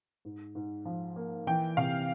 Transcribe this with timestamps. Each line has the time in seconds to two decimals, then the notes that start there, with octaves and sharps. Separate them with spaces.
0.25 G#2
0.55 G#2
0.85 F3
1.16 A#3
1.47 E3 G5
1.77 C3 F5